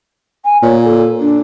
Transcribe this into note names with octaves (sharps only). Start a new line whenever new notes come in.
G#5
A#2 C#5
A4
D4